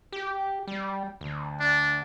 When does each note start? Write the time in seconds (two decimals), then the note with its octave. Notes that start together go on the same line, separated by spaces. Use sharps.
0.12 G4
0.67 G3
1.21 D2
1.60 D4